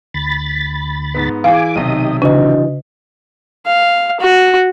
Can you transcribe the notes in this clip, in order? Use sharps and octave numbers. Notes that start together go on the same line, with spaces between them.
D2 B5 A6
G#2 B3
E3 G#4 F5 G#5 D6
B1 C3 D#3 G4 D#5 D#6
C#3 E3 D4 F#4 D#5
F5
F#4